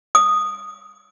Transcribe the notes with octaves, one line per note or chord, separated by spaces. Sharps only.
D#6